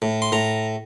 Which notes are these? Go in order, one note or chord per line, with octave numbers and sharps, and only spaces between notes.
A2
C6
A2 A#5